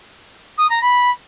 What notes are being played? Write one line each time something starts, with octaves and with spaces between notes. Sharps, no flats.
D#6
A#5
B5